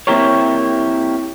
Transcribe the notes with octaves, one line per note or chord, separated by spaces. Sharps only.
A#3 C4 E4 G4 A#4 C#5